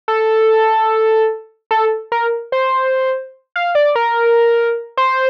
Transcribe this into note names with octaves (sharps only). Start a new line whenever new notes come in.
A4
A4
A#4
C5
F5
D5
A#4
C5